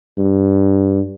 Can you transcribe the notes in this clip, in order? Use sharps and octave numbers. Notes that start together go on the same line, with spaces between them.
G2